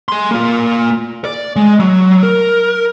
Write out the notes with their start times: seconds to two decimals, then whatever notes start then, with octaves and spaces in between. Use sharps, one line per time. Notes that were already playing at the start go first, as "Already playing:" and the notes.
0.09 G#4 C6
0.31 A#3 F4
1.25 D5
1.56 G#3
1.80 F#3
2.23 A#4